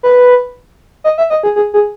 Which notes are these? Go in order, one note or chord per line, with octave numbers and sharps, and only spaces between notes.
B4
D#5
E5
D#5
G#4
G#4
G#4